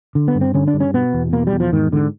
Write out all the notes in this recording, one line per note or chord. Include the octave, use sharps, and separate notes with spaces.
D3
B3
G2
C4
D3 C#4
D4
G2
C#4
B2 B3
E2
B2 A#3
G3
E2
F3
G#2 D#3
G#2 D3